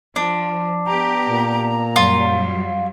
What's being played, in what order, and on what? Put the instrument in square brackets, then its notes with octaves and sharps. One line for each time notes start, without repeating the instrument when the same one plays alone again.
[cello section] F3 [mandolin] D4
[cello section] B3 G4 [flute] A#5
[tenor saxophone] A#2
[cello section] F#2 F#3 G3 [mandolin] F4